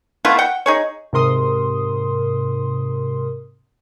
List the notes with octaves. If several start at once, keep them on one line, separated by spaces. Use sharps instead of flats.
A3 B3 E4 F4
F#5 G5
D#4 G#4 C#5
G#2 C3 A#4 C6 D#6